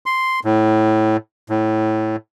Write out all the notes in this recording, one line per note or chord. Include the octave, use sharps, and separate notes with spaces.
C6
A2
A2